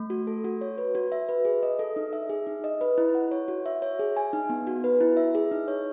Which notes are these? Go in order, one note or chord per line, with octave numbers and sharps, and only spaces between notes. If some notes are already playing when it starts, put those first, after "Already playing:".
Already playing: A3
F#4
A4
F#4
C#5
B4
F#4
E5
B4
G#4
D#5
A4
D#4
E5
G#4
D#4
D#5
B4
E4
F#5
C#5
F#4
E5
C#5
G#4
G#5
D#4
B3
F#4
B4
E4
E5
G#4
D#4
C#5